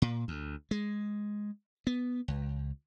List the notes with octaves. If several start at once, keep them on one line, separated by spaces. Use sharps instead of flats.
A#2
D2
G#3
B3
C#2